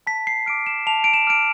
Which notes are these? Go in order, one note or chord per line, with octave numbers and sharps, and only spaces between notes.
A5 B6
C7
D6 F6 D7
E7
A5 F7
D7
E7
D6 F6 D7